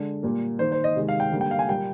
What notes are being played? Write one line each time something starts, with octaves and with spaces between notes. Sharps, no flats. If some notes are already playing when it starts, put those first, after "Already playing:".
Already playing: D3 G#3
A#2 G3 A#3
D#3 A#3 C5
C5
D#5
C3 D#3 G#3
F5
G5
D3 G3 A#3
G5
F5
G#5
A#2 G3 A#3 G5